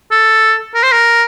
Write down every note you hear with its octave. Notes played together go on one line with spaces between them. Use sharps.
A4
A#4
C5
A#4